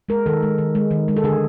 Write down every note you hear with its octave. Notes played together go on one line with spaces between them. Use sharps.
G#3 A#4
D#3 A4
G#3
D#3
G#3
D#3
G#3
A4
D3 G#4